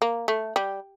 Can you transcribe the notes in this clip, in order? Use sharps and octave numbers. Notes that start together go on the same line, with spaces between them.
A#3
A3
G3